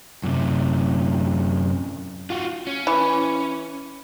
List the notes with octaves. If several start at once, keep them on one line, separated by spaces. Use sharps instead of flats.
F#2 C3
F4 F#4
C#4
E3